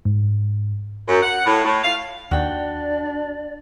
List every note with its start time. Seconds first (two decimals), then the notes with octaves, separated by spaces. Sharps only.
0.05 G#2
1.08 F#2
1.22 F#5
1.46 A2
1.65 A2
1.83 F5
2.31 D#2 D4 F#4 D5 G5